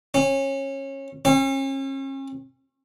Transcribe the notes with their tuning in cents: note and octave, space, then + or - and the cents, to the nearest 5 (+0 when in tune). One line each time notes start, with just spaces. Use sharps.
C#4 -25
C#4 -40